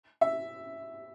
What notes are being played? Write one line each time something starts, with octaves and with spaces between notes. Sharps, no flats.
E5